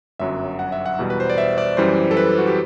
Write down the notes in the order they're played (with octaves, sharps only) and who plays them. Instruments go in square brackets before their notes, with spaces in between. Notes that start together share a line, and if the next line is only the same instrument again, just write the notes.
[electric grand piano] G1 F#2 F#3 E5
F#5
E5
F#5
E2 B2 G3
B4
C5
D5
E5
D5
F#2 E3 G3 C5
A4
B4
F#4
G4